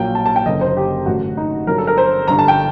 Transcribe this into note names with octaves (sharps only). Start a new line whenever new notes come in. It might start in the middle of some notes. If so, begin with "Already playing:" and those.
Already playing: A#1 A#2 F#3 G5
A5
A5
G5
F#1 F#2 D3 F#3 D#5
C5
G4
A1 G2 D3 F#3 F#4
D#4
G1 G2 D3 F#3 A#4
A4
A#4
C5
G1 G2 D3 A#5
A5
G5